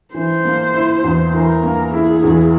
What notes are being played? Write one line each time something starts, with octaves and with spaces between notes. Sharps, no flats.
E3 C5
A#3
E4
E2
E3 A#4
A#3
E4 G#4
E2